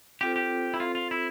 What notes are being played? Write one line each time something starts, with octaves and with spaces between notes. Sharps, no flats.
C4 F4 G4 A4 C5
G4
E4
F4
F4
E4